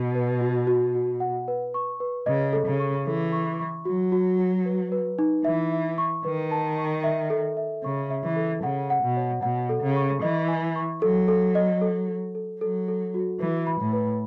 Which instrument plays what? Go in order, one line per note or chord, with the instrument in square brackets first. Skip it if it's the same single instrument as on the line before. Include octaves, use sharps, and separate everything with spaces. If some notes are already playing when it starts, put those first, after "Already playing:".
Already playing: [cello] B2
[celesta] B4
F#4
F#4
F#4
F#5
B4
C#6
B4
[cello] C#3 [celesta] D#5
[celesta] A4
[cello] C#3
[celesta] C#6
[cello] E3 [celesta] A4
[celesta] C#6
C#6
[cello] F#3 [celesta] F#4
[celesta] F#4
F#4
B4
B4
D#4
[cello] E3 [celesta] E5
[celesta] E5
C#6
[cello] D#3 [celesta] B4
[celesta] A5
C#6
E5
A4
E5
[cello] C#3 [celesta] C#6
[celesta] E5
[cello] E3
[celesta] A4
[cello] C#3 [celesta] F#5
[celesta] F#5
[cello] B2
[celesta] C#5
[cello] B2 [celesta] F#5
[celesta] A4
[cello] C#3
[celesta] C#6
[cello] E3 [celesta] D#5
[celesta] G#5
C#6
[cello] F#3 [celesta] A4
[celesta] A4
D#5
A4
A4
A4
[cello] F#3 [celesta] A4
[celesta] A4
F#4
[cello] E3 [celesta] B4
[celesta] B5
[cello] A2
[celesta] B4